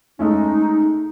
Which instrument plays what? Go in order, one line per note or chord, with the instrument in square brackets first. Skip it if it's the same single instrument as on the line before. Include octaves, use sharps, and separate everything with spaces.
[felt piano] G#3 A3 C#4 [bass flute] D#4